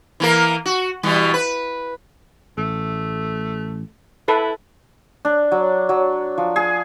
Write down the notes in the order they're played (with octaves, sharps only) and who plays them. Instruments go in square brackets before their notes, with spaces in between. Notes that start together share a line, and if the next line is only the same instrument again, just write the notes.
[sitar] E3 A#3 A#4
F#4
B2 E3 G3
B4
[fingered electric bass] A1 [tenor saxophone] A3
[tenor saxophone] E4 [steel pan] A4 B4
[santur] D4
F#3
F#3
F3
G#4